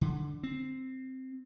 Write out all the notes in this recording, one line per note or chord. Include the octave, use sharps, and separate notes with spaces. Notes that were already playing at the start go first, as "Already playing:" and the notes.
D3
C4